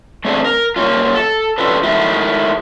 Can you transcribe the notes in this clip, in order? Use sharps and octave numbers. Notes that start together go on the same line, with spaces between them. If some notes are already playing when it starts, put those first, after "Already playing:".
A3 C4 D4 G#4
A#4
G3 A#3 C4 C#4 F4
A4
C#4 D4 F4 G4 A4 B4
D#3 G#3 A3 E4